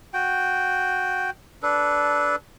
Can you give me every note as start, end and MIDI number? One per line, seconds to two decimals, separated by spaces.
0.14 1.30 66
0.14 1.30 79
1.63 2.36 62
1.63 2.36 69
1.63 2.36 71